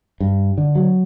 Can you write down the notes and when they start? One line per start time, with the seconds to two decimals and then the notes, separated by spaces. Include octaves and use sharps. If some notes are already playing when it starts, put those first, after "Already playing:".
0.20 G2
0.58 D3
0.75 F#3